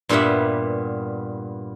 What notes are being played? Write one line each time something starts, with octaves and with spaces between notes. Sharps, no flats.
G2 A#2 G3 B3 E5 F#5